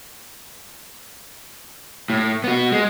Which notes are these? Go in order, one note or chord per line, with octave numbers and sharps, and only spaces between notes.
A2
B3 F#4
G#3